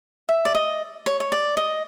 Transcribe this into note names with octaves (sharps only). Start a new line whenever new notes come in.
E5
D5
D#5
C#5
C#5
D5
D#5